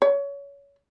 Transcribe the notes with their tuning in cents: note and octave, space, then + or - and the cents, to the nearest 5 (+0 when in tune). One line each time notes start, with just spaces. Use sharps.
C#5 +25